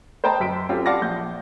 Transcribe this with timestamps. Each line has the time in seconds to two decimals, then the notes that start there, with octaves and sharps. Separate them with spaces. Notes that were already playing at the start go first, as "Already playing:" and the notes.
0.24 C5 D#5 G5 A5 A#5
0.40 F#2 B6 D7
0.69 C4 C#4 F4 G4 A4
0.86 D5 F5 F#5 A5 D6 A#6
1.02 A#1 G6